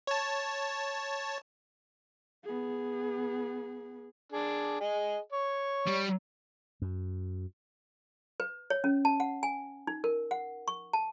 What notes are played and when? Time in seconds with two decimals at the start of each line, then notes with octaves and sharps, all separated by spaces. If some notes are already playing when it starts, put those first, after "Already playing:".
0.07 C#5 A5
2.44 B3 G#4
4.32 D4 G#4
4.80 G#4 D#5
5.32 C#5
5.87 G3
6.82 F#2
8.40 B4
8.70 C#5
8.84 C#4
9.05 A5
9.20 F#5
9.43 G#5
9.87 D#4
10.04 A#4
10.31 F#5
10.68 C#6
10.93 A5